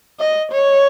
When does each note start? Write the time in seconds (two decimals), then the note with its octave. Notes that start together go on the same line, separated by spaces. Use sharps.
0.20 D#5
0.52 C#5